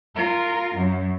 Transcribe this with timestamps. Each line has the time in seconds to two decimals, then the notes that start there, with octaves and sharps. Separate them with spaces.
0.16 F4 A#4
0.76 F#2